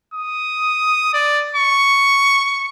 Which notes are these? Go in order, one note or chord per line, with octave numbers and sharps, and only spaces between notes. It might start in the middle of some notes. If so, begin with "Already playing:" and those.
D#6
D5
C#6